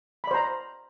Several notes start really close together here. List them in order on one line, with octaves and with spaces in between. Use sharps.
B5 D5 C5 A#5